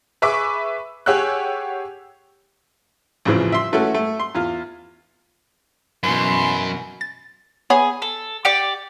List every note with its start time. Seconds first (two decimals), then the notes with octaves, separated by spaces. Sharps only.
0.22 G#4 B4 E5 B5 C#6 D6
1.06 G4 G#4 C#5 F#5 E6 F#6
3.25 A1 F2 C#3 E3 F3
3.52 E5 C6
3.72 E3 A3 C#4 F#4 A4
3.94 A3
4.19 C6
4.35 E2 F4
6.03 F#2 B2 E3 C6
7.01 A6
7.70 B3 G#4 C#5 B5
8.02 A4
8.45 G4 D5 C#7